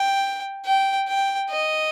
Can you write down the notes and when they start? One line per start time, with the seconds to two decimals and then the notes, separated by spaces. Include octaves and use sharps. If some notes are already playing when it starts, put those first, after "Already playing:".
Already playing: G5
0.66 G5
1.08 G5
1.50 D#5